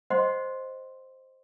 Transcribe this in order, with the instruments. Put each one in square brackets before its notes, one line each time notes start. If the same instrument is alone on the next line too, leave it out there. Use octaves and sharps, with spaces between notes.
[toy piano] C5 D#5 F#5 C6